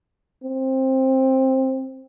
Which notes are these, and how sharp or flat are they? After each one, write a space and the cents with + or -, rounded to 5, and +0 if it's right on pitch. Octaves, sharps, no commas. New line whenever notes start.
C4 +15